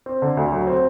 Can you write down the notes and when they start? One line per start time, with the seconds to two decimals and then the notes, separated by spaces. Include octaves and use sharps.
0.06 C4
0.22 D3
0.37 D2
0.52 F#3
0.67 C4